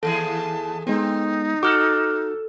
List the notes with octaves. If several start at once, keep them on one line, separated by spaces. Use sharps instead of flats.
D#2 E3 G#4 A4 A5
G#3 B3 C4 D#4
F#4 A4 D6 F6 F#6